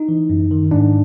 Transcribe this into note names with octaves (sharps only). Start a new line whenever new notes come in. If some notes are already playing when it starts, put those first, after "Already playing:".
Already playing: D#4
E3
F#2
D#3
G#2 D4